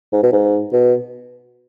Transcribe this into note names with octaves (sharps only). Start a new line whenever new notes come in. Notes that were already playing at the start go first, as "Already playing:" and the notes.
G#2
B2
G#2
B2